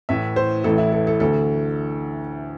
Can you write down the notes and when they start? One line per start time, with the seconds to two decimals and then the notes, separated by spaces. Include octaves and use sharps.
0.09 A1 A2 E3 E5
0.36 C5
0.64 A1 A2 E3 A4
0.78 E4
0.93 A4
1.07 A4
1.20 D2 D3 A4